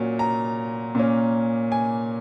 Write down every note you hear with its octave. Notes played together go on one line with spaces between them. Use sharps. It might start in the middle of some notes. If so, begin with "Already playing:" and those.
Already playing: A#2 F#3 C#4
A#5
A#2 A#3 C#4
G#5